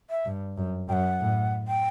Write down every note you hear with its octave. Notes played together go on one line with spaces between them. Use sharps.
E5
G2
F#2
F#2 F#5 G5
A2
G5